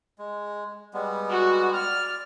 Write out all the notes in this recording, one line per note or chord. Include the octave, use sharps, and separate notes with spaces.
G#3
G3 G#3 B3
F#4
D5 F6